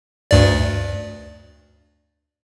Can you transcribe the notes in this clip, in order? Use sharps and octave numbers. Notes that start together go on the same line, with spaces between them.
D2 G2 D5